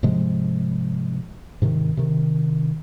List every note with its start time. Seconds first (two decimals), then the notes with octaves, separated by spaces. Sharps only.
0.03 G#2 C3 F3 G#3
1.62 G#2 C3 D#3
1.97 C3 D#3